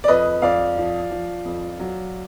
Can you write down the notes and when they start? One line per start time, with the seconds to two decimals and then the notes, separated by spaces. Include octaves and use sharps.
0.04 D5
0.08 F2 B4 D#5
0.42 F2 D5 F5
0.77 F3
1.11 F3
1.45 F2
1.79 F#3